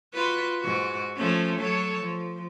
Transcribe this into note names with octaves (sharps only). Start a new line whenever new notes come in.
F4 F#4 B4
G#2 F#4
F3 A3 C#4
F#3 A4 C#5
F3